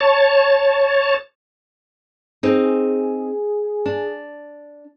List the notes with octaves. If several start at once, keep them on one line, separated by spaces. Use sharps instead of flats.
C#5 A5
C4 D#4 G#4
D4